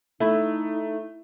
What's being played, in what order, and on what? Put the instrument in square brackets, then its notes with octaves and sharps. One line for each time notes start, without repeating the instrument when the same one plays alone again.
[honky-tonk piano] A3 [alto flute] D#4 [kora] E4